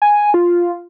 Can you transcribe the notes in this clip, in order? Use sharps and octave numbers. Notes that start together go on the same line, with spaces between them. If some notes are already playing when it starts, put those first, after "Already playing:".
G#5
F4